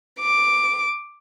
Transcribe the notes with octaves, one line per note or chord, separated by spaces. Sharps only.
D6